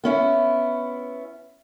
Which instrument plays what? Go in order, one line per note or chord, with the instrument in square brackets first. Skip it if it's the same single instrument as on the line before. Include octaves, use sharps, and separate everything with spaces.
[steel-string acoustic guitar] B3 C#4 E4